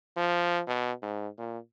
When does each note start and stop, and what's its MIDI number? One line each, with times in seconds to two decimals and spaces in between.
0.16 0.61 53
0.67 0.92 47
1.02 1.28 44
1.38 1.59 46